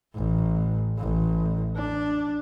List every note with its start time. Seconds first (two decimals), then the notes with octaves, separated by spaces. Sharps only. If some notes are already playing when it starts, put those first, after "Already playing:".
0.14 A1
0.98 A1
1.76 D4